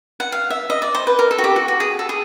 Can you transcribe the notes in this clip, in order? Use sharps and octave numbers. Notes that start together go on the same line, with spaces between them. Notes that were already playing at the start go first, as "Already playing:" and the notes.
F#5
F5
E5
D#5
D5
C5
B4
A#4
A4
F#4
G4
F#4
F#4
G#4
A4
G#4